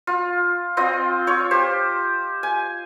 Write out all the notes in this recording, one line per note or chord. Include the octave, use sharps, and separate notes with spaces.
F4
C4 F4 D#5
F4 C#5
G4 C5
G#5